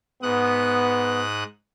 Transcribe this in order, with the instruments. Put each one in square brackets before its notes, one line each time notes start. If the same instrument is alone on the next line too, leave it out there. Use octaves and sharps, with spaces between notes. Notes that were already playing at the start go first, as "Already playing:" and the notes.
[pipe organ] G#2 D#6 F#6 [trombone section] B3